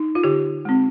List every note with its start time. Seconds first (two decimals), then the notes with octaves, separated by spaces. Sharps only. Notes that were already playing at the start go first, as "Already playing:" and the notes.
Already playing: D#4
0.15 F4
0.24 D3 G4
0.65 G#3 C4